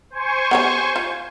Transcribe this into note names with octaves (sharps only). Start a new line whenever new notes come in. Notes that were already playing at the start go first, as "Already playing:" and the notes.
C5 G#5 C#6
B3 G4 C#5
F4